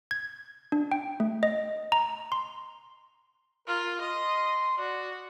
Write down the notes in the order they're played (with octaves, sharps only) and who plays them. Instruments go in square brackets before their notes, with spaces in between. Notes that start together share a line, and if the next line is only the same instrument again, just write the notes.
[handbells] G#6
D4
G5
A3
D#5
A#5
C6
[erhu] F4 [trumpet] A#4
[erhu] D#5 [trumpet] C6
[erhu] F#4 [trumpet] D5